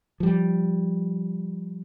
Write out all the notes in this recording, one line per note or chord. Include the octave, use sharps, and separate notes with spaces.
F3 G3